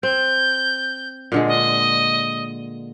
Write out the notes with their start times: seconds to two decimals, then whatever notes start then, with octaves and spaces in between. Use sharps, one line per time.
0.03 C4 G6
1.32 A#2 D3 G#3
1.47 D#5